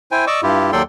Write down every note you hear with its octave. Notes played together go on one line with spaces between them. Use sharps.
E4 C5 G5 G#5
D5 D#5 C#6 D6 E6
G2 E4 F4 G4
D#2 F#3 A4 D5 G5 C6